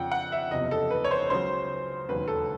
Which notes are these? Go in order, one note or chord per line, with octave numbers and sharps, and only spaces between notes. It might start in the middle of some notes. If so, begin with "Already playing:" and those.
Already playing: F2 C#3 F3 F#5 G5
F#5
E5
F#1 E2 C3 F3 D#5
A4
B4
C#5
C5
C#2 C#3 F#3 C5
E1 D#2 C#3 F#3 B4
A4